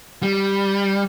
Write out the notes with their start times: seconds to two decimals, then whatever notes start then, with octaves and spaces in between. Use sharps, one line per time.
0.23 G3